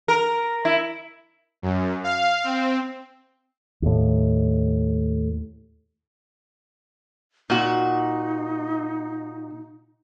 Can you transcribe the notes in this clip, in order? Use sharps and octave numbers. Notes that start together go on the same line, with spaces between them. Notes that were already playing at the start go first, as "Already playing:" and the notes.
A#4
E4
F#2
F5
C4
D#2 A2
A#2 D#4 F#4